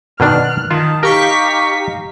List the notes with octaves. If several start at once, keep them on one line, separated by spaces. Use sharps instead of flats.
B2 D#3 D4 F6 F#6
D#3 F4 A5
D#4 G4 A#4 F5 C#6 B6